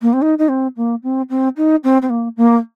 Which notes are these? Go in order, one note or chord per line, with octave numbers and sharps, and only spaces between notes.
A#3
C4
D#4
D#4
C4
A#3
C4
C4
D#4
C4
C4
A#3
A#3